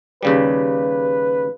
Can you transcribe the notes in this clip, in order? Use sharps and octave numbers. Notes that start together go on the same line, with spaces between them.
D#2 C#3 G3 B4